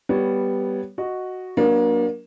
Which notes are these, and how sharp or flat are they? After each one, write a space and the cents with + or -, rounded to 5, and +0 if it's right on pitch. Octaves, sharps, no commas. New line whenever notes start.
G3 +0 B3 +0 C#5 -5
F#4 +0 D#5 +0
F#3 +0 A#3 +30 D4 +0